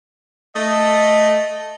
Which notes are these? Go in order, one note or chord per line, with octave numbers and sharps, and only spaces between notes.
A3 D#5